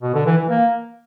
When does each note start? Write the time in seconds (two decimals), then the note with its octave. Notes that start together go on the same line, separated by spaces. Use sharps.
0.03 B2
0.15 D3
0.26 E3
0.38 E3
0.49 A#3